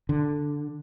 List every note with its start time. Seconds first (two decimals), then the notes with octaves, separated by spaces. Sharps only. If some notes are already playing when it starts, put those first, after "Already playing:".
0.09 D3